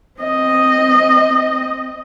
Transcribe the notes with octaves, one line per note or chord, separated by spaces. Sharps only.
C4 D#5